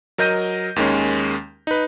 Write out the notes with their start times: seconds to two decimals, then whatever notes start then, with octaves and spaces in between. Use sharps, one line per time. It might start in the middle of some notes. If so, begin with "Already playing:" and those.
0.18 F#3 A#4 D#5 G6 A#6 D#7
0.76 D#2 D#3 G#3 C#4
1.67 D#4 B4